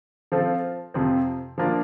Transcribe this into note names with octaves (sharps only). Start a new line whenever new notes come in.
F3 C4 F4 A4
F2 C3 F3 C4
F3 A#3 D4 F4